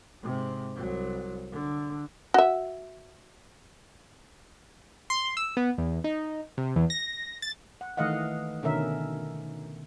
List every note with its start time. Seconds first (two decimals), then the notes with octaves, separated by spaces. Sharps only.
0.23 G#2 C3
0.76 C2 F#3
1.52 D3
2.34 F#4 E5
5.10 C6
5.37 E6
5.57 B3
5.78 E2
6.04 D#4
6.58 C3
6.76 E2
6.90 A#6
7.42 A6
7.81 F#5
7.97 D#3 E3 A3 D#5 F5 F#5
8.63 B2 D3 D#3 C#4 A#4 E5